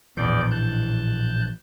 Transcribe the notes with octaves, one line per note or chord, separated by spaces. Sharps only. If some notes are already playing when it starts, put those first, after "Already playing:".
A#1 E2 A2 E3 D5 G6
A5 F#6 G6